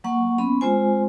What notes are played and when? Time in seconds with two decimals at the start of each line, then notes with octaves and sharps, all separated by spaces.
0.04 F#3 A#3 F#5 C#6
0.38 B3 C#4 B5 C6
0.61 G#3 C4 F4 C5 G#5